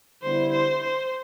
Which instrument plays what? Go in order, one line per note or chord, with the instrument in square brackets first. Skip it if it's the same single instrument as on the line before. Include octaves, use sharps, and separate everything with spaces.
[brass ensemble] D3 G3 B3 E4 [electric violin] C5
[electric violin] C5
C5